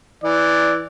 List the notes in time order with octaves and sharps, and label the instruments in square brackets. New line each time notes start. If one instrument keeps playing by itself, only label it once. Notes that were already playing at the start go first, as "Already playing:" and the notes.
[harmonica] E3 [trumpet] D5